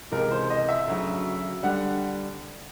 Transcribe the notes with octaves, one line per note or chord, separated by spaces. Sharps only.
C#2 C3 E3 G#3 A#4
C5
D#5
E5
D2 C#3 F#3
D3 G3 F#5